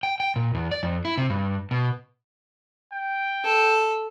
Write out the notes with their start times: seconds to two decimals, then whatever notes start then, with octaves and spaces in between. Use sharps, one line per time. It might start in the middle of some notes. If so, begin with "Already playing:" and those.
0.03 G5
0.20 G5
0.36 A#2
0.55 E2
0.71 D5
0.83 F2
1.05 E4
1.18 C3
1.30 G2
1.71 B2
2.92 G5
3.45 A4